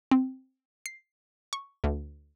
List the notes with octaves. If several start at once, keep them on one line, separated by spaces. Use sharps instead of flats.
C4
C7
C#6
D2